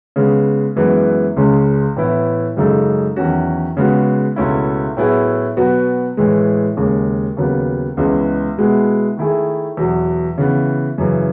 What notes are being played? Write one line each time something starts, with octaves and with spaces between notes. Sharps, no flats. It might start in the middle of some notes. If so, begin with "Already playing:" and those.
C#3 G#3 B3
F#2 E3 G#3 B3
C#2 C#3 G#3 C#4
A2 E3 B3 E4
F#2 C#3 G#3 D#4 A4
E2 D#3 F#3 C#4 F#4
C#3 G#3 B3 F#4
C#2 B2 A3 C#4 E4
A2 F#3 B3 E4 G#4
B2 F#3 B3 F#4
A2 E3 G#3
D#2 C#3 G#3
D#2 C#3 F#3 B3
C#2 C#3 E3 G#3 B3
B2 G#3 B3 E4
D#3 A3 E4 G#4
E2 B2 F#3
C#3 E3 B3
F#2 C#3 E3